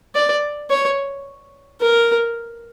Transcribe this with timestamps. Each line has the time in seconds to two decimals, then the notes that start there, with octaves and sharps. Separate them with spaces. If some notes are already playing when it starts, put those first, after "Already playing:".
0.15 D5
0.70 C#5
1.80 A#4